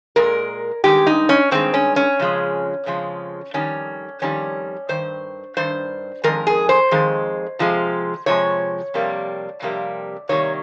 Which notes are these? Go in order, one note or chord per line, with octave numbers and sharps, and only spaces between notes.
A#2 G#3 A#4
G2 D#3 G#3 G4
D#4
C#4
G2 D#3 G#3 C4
C#4
C#4
F2 C#3 F3 G#3
F2 C#3 F3 G#3
F2 D#3 G3 C#4
F2 D#3 G3 C#4
G2 D#3 C5
G2 D#3 C5
F2 D#3 G#3 A#4
G#4
C5
F2 D#3 G#3
C3 F3 G#3
C3 F3 G#3 C#5
F2 C3 G3 A#3
F2 C3 G3 A#3
C3 D#3 G3 A#3 C#5